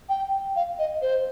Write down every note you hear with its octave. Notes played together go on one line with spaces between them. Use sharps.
G5
F5
D#5
C5